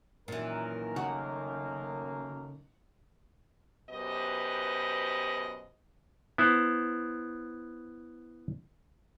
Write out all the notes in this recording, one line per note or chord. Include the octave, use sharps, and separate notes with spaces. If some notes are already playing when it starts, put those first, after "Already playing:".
F#2 A#2 D#3 E3 A#4
C#3 F#3 A3 A#3 F#4
F#2 B2 G4 B4 C5 D#5
B3 E4 C5